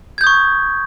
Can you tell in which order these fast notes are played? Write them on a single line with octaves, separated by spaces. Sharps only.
G#6 G6 D#6 C#6